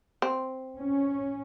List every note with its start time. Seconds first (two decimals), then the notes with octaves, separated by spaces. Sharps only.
0.22 C4
0.76 C#4